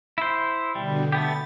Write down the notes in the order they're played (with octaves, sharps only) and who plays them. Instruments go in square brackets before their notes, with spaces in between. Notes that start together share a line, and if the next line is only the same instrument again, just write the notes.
[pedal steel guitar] E4 C5
[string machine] B2 D3 [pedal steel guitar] G3
[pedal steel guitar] A3 B3 G4 [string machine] A6